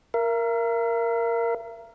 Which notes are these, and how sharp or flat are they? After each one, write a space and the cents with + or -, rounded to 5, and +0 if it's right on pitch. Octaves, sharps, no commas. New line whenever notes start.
A#4 +0 E5 +45